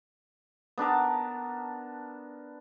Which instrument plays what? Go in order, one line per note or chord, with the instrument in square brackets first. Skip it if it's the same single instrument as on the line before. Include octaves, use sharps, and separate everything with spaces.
[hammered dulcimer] B3 D4 A#4 A5